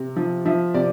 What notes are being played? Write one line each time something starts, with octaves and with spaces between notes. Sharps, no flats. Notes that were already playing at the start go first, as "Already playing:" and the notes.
Already playing: C3
F3
F3 E5
C3 D5